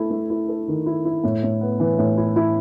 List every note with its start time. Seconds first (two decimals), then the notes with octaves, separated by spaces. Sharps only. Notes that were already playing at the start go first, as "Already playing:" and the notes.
Already playing: A3 E4 A4
0.10 A3
0.30 E4
0.49 A4
0.68 D#3
0.86 E4
1.05 E4
1.24 A2
1.43 A2
1.61 B3
1.80 E3
1.98 A2
2.17 E4
2.36 E4